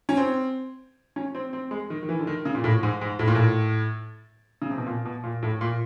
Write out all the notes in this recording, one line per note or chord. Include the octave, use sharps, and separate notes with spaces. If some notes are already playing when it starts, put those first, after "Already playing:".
C#4
C4
C#4
C4
C4
G#3
D#3
D#3
E3
D3
D#3
C#3
A#2
A2
G#2
G#2
A2
A#2
A2
C#3
C3
B2
A#2
B2
A#2
A2
A#2